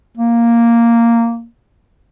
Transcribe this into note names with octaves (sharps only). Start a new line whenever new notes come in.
A#3